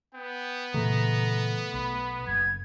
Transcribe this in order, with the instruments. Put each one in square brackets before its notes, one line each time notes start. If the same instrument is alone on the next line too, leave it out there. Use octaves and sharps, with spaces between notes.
[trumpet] B3 [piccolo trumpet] G5
[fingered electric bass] A#2 C#3 E3 [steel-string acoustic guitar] A3 [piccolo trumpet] A#5
[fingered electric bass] B1 [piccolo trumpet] B5
[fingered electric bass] F#1 [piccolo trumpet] G#6